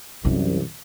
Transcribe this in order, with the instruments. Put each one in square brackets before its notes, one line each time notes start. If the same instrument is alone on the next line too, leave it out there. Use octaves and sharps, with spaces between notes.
[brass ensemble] C2 F#2 [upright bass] C3 E3